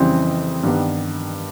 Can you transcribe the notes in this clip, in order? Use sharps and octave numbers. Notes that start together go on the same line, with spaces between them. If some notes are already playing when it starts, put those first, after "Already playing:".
Already playing: F2 C#3 E3 G3 C4
G2 D#3 G3 B3